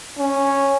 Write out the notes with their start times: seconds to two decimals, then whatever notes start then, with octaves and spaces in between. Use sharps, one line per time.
0.18 C#4